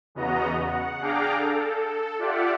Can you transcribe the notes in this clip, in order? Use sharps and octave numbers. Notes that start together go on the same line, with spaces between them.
E2 C#3 B3 F#4 D#5 A#5
F#5
D4 G#4 F5 G5 A#5 D6
A4
F4 G4 D5 E5 F#5